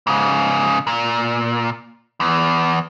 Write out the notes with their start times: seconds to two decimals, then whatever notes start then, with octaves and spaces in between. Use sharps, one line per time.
0.07 G#2 C#3
0.87 A#2
2.20 E2